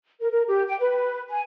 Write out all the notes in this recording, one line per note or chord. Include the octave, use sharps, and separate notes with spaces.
A#4
A#4
G4
G5
B4
G#5